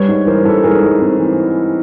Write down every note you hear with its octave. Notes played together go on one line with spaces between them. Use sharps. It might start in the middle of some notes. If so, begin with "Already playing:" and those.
Already playing: G3 B4 C#5
G#2
E3 A#4 C5
G#2 A4 B4
G#2 G#4 A#4
G#2
C4
E3